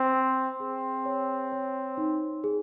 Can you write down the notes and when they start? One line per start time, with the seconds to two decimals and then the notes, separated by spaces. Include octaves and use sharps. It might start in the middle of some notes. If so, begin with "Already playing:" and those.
Already playing: C4
0.13 C5
0.60 C4 G#4
1.05 C#5
1.52 C#5
1.97 D#4
2.44 G#4